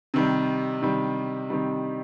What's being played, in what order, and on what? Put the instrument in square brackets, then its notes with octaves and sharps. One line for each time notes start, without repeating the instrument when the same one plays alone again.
[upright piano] C3 D#3 G3
C3 D#3 G3
C3 D#3 G3